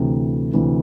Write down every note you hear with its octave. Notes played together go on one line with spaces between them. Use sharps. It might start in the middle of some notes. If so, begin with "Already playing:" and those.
Already playing: D2 C3 E3
D2 C3 E3